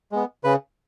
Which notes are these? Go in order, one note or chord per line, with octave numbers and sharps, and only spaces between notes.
G#3 B3
C#3 B4